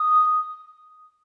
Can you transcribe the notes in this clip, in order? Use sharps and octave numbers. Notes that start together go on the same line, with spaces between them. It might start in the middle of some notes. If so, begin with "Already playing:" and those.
Already playing: D#6